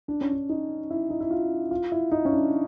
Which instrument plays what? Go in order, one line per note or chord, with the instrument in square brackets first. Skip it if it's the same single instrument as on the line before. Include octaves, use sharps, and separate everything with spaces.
[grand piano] D4
C#4
D4
D#4
E4
D#4
E4
F4
F4
E4
D#4
C#4
D4